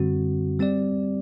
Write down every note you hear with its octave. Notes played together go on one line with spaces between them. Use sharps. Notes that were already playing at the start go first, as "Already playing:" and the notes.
Already playing: F#2 D3 G3 C4 F#4
G3 C4 G4 D5